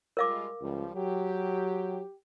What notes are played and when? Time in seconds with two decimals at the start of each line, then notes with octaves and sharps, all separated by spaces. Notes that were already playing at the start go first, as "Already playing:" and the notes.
0.17 G3 G#3 F4 A#4 F5 D6
0.61 C#2 F3 G3
0.95 F#3 G4